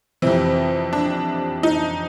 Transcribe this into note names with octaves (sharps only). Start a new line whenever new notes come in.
F2 C3 E3 C4
D4
D#4